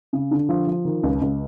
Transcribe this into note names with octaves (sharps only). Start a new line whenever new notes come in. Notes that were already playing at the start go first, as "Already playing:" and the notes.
C#3
D3
F3
F3
D#3
C#2
C#2